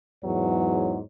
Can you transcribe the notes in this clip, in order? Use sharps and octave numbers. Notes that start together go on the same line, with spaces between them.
E2 G#2 E3 F#3 C#5